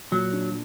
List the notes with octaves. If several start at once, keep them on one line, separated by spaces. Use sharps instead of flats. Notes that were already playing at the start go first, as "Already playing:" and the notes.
A#2 F#3
D4